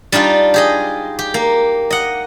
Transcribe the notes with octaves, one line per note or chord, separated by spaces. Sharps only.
G3 D4 D#4 F4
G4 G#4 D#5
G4
A#3
D#5 F#5